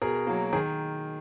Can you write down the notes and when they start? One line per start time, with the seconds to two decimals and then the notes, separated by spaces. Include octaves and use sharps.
0.02 B2 G#4 A#4
0.27 F#3 A#3
0.52 D#3 G#4 A#4